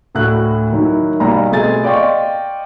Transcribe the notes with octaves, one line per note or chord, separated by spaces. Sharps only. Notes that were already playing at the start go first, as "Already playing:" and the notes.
D2 A2 E4 F#4 F#6
D#3 F#3 E4
B1 G3 A#5
B2 A3 C4 G#4 G#5 A6
D5 D#5 F5 G5 C6 C#6